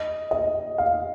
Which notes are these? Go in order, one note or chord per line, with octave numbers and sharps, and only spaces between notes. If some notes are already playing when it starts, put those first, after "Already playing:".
Already playing: D#5
D#5
F5